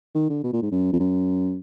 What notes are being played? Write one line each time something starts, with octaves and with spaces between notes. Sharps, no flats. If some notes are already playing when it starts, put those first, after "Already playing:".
D#3
D3
B2
A#2
G#2
F#2
F2
F#2